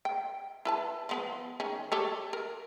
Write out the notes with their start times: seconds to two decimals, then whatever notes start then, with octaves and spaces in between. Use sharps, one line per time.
0.05 G5
0.65 E4 B4 A5
1.09 F3 B3 B4
1.60 D#3 C#4 G#4
1.92 G4 A4 C#5
2.33 A#4